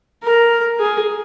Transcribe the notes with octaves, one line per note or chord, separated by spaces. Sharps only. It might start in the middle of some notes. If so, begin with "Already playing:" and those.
A#4
G#4